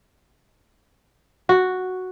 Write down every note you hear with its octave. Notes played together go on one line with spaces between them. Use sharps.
F#4